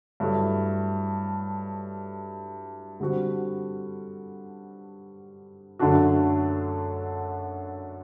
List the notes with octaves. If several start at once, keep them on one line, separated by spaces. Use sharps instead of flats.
G2 F#3 A3 E4
D3 G3 C4 F#4
F#2 D3 A3 D4 F#4